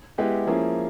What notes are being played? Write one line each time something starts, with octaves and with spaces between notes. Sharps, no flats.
G#3 B3 E4 G4 B4
F3 A#3 C#4 E4 G#4